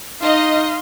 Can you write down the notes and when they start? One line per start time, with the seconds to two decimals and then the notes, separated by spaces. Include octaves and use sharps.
0.22 D#4 D#5 F5 C6